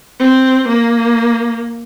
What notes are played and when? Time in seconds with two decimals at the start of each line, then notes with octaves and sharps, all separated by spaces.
0.20 C4
0.68 A#3